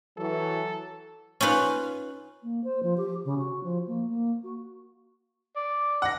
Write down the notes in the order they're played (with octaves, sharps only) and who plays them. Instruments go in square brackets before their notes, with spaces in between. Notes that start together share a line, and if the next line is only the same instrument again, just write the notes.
[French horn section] E3 F#3 [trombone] A4
[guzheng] C#4 D#4 F4 B4
[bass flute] A#3
C5
F3
G4
C#3
F#4
F3
A#3
A#3
F#4
[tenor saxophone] D5
[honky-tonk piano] F#5 A#6